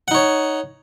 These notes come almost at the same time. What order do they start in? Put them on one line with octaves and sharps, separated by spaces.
F#5 D#4 C#5